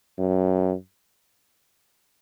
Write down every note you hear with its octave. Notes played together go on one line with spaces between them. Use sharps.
F#2